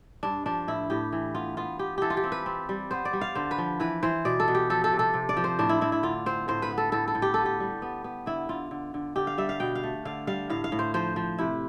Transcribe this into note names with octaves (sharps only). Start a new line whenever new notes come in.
G2 D4
F3 D4
A2 E4
A2 G4
E3
B3 F4
B3 F4
B3 G4
E3 G4 A4
F4
G4
C4
B4
C4
G3
B3 C5
D5
G3
F5
D3 C5
B4
F3
E3 B4
E3 C5
B2 D5
A4
B2
G4
F3 A4
A4
C3
A4
C3
D5
F3
C5
A2 D4
E4
A2 E4
E4
D3 F4
C4 C5
A2 C5
B4
B3
A4
A2 A4
A4
A2
G4
B3 A4
G4
G3
B3
B3
D3 E4
D3 F4
D3
D3
D3 G4
F5
G3 E5
F5
B2 G5
F5
A3
D3 F5
G3 F5
A2 F5
F5
A2
C5
F3 C5
F3
C3 E4